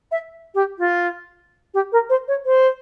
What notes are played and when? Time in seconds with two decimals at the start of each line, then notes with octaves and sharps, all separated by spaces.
0.11 E5
0.54 G4
0.78 F4
1.74 G4
1.92 A#4
2.09 C5
2.27 C#5
2.45 C5